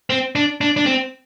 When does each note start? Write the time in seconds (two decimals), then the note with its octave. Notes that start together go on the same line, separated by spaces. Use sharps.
0.10 C4
0.35 D4
0.61 D4
0.77 D4
0.86 C4